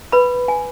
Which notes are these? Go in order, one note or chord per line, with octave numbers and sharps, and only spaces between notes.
B4 B5
G#5